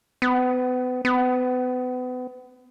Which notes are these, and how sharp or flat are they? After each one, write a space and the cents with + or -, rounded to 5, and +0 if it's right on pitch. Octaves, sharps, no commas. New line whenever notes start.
B3 +35
B3 +35